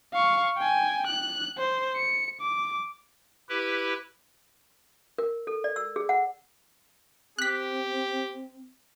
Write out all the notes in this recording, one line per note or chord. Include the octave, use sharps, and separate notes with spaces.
F5 C#6
G5 G#5
F#6
C5
C#7
D6
E4 G4 B4
A#4
A4
D5
E6
G#4
F#5
C4 G4 F#6 B6